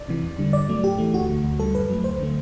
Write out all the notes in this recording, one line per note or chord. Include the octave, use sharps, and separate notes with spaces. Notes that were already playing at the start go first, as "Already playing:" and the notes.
Already playing: D5
C3 E3
E2
D3 G3
G2 D5
F#3 A3
A2 G4
E3 A3
D2 F#4
D3 A3
D2
D3 G3 A4
F#2 B4
F#3 A3
D2 C5
D3 F#3 A3